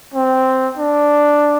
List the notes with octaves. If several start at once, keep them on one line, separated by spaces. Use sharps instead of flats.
C4
D4